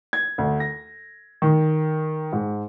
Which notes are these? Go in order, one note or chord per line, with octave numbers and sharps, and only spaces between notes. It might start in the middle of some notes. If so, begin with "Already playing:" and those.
G#6
D2
A#6
D#3
G#2